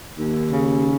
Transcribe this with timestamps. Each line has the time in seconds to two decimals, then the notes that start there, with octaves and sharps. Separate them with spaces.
0.18 D#2
0.50 C#3